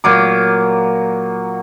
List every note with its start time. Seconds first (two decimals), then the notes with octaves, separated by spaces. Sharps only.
0.04 A#2 F#3 D6